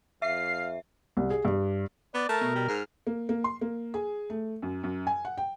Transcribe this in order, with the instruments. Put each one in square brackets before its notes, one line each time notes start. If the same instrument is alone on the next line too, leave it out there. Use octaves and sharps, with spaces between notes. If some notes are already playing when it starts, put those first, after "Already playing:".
[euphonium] F2 [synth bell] E5 [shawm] F5 [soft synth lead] C7
[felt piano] C2
G#4
G2
[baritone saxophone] B3 [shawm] D5
[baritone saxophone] A3 [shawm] A#4 [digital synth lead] A5
[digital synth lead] B2
[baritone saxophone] G3
[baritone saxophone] G#2 [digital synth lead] F6
[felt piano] A#3
A#3
C6
A#3
G#4
A3
F#2
F#2
G#5
F#5
G5